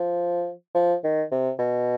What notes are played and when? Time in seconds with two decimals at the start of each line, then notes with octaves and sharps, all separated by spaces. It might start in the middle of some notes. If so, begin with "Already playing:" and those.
Already playing: F3
0.75 F3
1.04 D#3
1.31 C3
1.59 B2